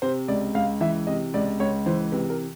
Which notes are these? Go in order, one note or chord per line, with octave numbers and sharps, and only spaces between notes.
C3 C5
C#2 D5
C#2 F5
E3 E5
C3 D#5
C#2 D5
C#2 C#5
E3 C5
C3 B4
A#4